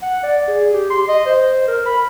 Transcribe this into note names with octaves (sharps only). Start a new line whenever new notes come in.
F#5
D5
G#4
G4
C6
D#5
C5
A#4
B5